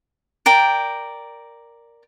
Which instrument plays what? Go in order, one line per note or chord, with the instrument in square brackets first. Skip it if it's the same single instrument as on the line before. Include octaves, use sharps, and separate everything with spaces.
[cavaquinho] A#4 D5 G5